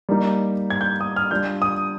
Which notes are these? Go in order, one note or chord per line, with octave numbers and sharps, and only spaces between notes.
G3 A#3 D#4
G#6
G6
D#6
F6
G3 D4 F4 G6
D#6